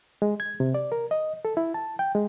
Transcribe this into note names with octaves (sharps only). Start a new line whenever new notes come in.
G#3
G#6
C3
D5
A#4
D#5
A4
E4
A5
G5
G#3